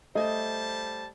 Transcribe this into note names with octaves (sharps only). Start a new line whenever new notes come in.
G3 A3 C5 D#5 A5